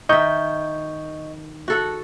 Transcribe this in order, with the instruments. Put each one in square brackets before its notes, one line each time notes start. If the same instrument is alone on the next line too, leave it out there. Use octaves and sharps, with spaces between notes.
[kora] D#3 E5 [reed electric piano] D#5 C#6 G6
[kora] F#4 A4 F#5